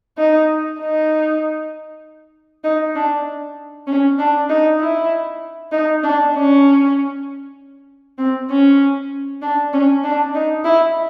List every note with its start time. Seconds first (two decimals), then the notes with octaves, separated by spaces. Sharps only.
0.18 D#4
0.80 D#4
2.64 D#4
2.95 D4
3.87 C#4
4.19 D4
4.49 D#4
4.80 E4
5.72 D#4
6.03 D4
6.34 C#4
8.18 C4
8.50 C#4
9.42 D4
9.73 C#4
10.04 D4
10.35 D#4
10.65 E4